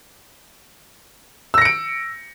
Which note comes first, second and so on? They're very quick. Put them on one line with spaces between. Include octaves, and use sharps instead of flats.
E6 A#6 C#7 D7